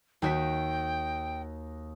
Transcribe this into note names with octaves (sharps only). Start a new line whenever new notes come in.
D#2 F#4 G5 B6